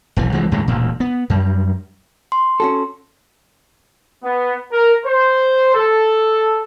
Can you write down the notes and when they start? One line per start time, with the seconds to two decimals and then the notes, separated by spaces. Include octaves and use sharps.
0.17 F1 B1 E3
0.32 C2 E3 F3 G#3
0.52 D#2 A2 D3 G#3
0.68 E1 D2 A#2
1.00 B3
1.30 F#2 G3
2.32 C6
2.60 C#4 F#4 A4
4.24 B3
4.71 A#4
5.06 C5
5.75 A4